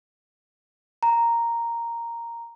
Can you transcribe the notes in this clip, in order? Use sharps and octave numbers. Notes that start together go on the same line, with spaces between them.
A#5